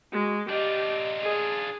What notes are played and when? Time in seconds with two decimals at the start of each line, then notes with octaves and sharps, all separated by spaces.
0.12 G#3 F#4
0.50 D4 F4 G4 D#5
1.23 G#4